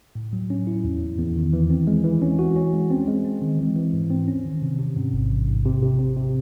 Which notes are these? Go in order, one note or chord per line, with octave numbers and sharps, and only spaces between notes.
A2
F#3
C#4
E4
E2
E2
E2
D#3
E3
C4
G#3
E3
C#4
F#4
C#4
G#3
C4
G#3
C4
D#3
E3
E3
G#2
C4
C#4
D#3
C3
C3
G#2
A1
A1
G#2
C3
C3
C3
C3